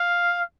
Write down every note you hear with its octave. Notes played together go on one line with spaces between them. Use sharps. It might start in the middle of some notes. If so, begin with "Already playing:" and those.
Already playing: F5